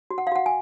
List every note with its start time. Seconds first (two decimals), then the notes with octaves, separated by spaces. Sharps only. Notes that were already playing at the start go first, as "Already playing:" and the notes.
0.11 F#4
0.18 F#5
0.27 F5
0.32 F#4 F#5
0.46 G#5